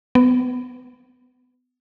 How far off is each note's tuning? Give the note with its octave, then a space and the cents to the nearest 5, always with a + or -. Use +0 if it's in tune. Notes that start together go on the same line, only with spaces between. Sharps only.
B3 +25